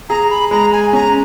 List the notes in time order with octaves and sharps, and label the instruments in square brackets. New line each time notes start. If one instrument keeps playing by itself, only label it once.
[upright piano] G#4 [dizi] A#5
[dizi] B5
[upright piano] G#3 [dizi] A#5
[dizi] G#5
[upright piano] C#4 [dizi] A#5